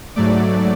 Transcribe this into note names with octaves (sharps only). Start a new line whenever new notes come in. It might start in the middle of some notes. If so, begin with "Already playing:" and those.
G#2 F#3 A3 D5